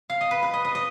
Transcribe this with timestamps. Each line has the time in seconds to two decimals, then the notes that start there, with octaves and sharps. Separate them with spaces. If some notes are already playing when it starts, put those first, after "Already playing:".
0.10 F5
0.21 D#5
0.31 B4
0.43 B4
0.54 D#5
0.65 D#5
0.75 D#5